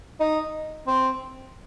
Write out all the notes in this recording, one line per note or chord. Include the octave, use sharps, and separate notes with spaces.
D#4
C4